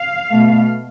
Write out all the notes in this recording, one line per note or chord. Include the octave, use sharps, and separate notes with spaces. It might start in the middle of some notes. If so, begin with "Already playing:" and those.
Already playing: F5
B2 A3